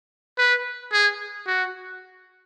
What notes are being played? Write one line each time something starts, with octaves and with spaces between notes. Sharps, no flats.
B4
G#4
F#4